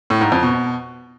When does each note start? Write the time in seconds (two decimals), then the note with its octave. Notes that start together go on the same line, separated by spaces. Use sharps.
0.10 A2
0.21 G#2
0.32 F2
0.43 B2